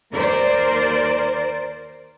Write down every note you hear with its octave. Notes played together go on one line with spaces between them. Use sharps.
D#2 A#4 C5 D5